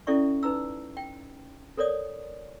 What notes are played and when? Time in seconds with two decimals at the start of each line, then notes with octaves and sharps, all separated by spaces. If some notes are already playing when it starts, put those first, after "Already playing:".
0.07 C#4 E4 A4 D5 E5 C#6
0.43 D#4 B4 A#5 E6
0.97 G5
1.77 A4 A#4 C#5 D5 D#6